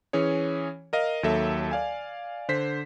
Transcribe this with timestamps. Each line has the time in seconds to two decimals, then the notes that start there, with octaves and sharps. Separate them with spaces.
0.13 E3 C#4 G#4 C#5
0.93 A#4 D#5 F5
1.23 D#2 F#3 A4 E5
1.71 D5 F5 G#5
2.49 D3 C5 B6